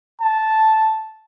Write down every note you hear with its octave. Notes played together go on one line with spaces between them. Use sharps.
A5